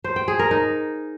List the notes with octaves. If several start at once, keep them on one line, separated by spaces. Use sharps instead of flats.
C5
G5
G#4
A#4
D#4